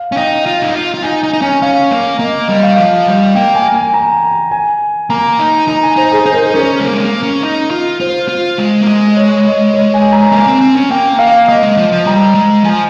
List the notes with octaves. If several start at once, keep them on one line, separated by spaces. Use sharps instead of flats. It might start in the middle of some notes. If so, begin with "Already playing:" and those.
Already playing: F5
C#4
D#4 G5
F4
D#4
F4
F4
D#4 G#5
D#4 G#5
D#4
C#4 G#5
C#4 F5
A#3
A#3 D#5
G3 D#5
F5
F3
G3
A#3 G5
G#5
G#5
A#5
G#5
A#3 A#5
D#4
D#4 A#5
G#5
D#4 C5
G#4
D#4 C5
A#4
G#4
C#4 A#4
G#3
A#3
G#3
A#3
C#4
D#4
F4
F4 C5
F4
G#3
A#3
G#3
D#5
C#5
D#5
C#5
G#5
A#5
A#3 G#5
C4
C4
C#4
A#3 G5
A#3 F5
A#3 D#5
G#3
F3
F3
G3 A#5
G#3
F3 G#5